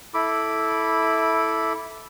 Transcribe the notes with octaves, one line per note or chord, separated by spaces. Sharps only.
E4 A4 B5 D6